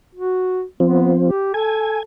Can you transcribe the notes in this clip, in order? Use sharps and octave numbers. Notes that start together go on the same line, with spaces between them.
F#4
F3 B3 C4
G4
A4 G#5